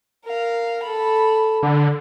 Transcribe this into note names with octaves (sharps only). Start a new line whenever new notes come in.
A#4 F5
A4 B5
D3